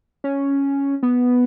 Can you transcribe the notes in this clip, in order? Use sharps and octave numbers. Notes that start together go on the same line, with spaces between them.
C#4
B3